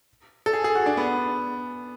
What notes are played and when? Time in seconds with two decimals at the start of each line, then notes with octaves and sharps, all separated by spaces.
0.46 A4
0.53 G#4
0.64 G#4
0.75 F#4
0.86 D4
0.97 B3